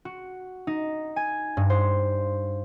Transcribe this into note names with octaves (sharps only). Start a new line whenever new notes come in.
F#4
D#4
G#5
G2
C5